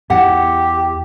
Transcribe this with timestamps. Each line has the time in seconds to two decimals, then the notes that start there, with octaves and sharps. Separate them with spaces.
0.10 E2 G4 F#5